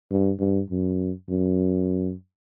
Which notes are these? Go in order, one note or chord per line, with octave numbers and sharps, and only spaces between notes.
G2
G2
F#2
F#2